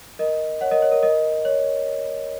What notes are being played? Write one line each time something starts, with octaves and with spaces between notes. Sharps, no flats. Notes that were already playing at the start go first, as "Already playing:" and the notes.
A#4 D#5
C#5 F#5
A#4 D#5
C#5
A#4
A#4 D#5
C#5